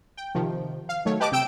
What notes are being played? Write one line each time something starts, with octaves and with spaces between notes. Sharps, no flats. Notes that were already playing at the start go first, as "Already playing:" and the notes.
G5
C3 D#3 F3
F5
D#3 F#3 A3 C#5
G4 B4 D#5 A5 D6
C3 G5 E6 D7